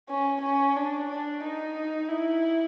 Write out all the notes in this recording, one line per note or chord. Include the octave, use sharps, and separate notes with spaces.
C#4
C#4
D4
D4
D#4
E4